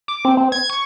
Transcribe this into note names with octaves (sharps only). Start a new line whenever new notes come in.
D6
C4
C4
G#6
C#6